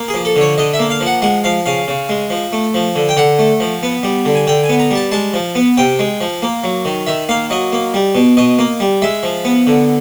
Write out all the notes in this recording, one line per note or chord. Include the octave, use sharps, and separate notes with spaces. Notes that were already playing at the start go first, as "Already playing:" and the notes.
Already playing: A#3
G#4
F3
A4
D3
C#5
D3 D#5
E5
A#3
F5
F3
F#5
G#3 F#5
F3 F5
C#3 F5
C#3
G#3
F3
A3
F3
D3
G5
D3 F#5
A3
F3
B3
G3
D3
G#5
D3 G5
G#5
B3
A#5
G3 A5
G#3 A5
F3
B3
C3 G5
G#3
F3
A#3
F#3
D#3
D#3 E5
A#3 F5
F#3 D#5
A#3
G3
B2
B2 D#5
A#3
G3
G#3 E5
F3
B3
D3